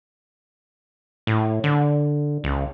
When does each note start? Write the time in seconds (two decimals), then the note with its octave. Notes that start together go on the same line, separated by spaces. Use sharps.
1.27 A2
1.64 D3
2.44 C#2